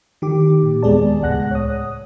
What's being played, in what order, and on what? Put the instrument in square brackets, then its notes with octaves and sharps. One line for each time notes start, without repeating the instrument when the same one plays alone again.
[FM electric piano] D#3 G4 D6
A#2
D#2 G#3 B3 G#4 D5 A5
C#2 A2 F#5 F#6 A#6
C#5 D#6